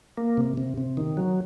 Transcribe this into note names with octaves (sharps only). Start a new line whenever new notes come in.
A#3
C3
C3
C3
D#3
F#3